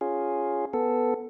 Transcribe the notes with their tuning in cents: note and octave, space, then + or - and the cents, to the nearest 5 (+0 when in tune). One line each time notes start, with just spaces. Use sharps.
C#4 +0 F4 +5 G#4 +0
B3 +0 A4 +0